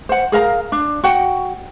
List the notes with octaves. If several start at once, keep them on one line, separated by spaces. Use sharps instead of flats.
C5 F#5
G#4 A#4 F5 A#5
D4
F#4 F#5 G5